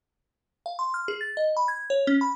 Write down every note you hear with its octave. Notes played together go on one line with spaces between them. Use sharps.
F5
C6
F6
G#4
A6
D#5
B5
G#6
C#5
C#4
B5